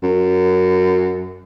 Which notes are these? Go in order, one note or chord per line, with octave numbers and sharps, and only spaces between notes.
F#2